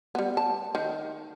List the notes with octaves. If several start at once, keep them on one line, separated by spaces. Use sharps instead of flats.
G3 B3
A5
D#3